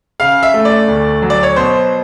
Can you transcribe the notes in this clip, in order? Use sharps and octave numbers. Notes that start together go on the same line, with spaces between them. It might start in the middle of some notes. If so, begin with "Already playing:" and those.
C#3 F5
E5
A3
D5
D2
F#3
D5
C#5
B2 C5